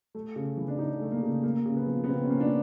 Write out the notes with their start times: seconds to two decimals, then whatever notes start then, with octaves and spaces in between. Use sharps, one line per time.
0.15 A3
0.36 C#3
0.57 E3
0.68 D4
0.79 C#3 D#4
1.01 A3
1.12 A#3
1.23 C#3
1.44 A#3
1.66 C#3
1.77 B3
1.87 F3
2.04 B3
2.08 C#3 C4
2.24 C#4
2.30 A#3
2.40 D4